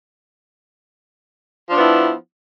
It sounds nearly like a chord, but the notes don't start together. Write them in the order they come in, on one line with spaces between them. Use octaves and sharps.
F3 D4 B3 E4